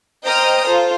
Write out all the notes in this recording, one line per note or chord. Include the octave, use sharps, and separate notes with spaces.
C5 D#5 G5 A#5 D#6 F6
F4 A4 C5